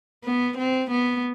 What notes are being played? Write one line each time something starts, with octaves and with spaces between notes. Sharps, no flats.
B3
C4
B3